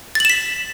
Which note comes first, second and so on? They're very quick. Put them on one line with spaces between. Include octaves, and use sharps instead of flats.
A6 F#7 E7 B6